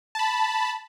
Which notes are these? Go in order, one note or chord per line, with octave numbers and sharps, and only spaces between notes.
A5 B5